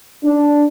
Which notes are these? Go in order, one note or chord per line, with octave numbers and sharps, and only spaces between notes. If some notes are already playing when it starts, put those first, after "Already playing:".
D4